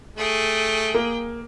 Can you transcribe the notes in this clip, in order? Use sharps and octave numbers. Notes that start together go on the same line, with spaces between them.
A3 G#4 G5
A#3